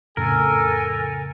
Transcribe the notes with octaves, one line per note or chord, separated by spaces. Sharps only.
F2 A2 C#3 A4 A#4 G#5